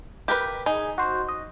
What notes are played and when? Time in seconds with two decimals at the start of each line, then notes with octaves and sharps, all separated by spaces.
0.28 G4 A#4 B4
0.66 D#4 G#4
0.98 F#4 C5
1.29 D#5